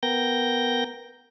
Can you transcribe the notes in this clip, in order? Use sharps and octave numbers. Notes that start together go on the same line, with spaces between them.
B3 A#4 G5 G6 A#6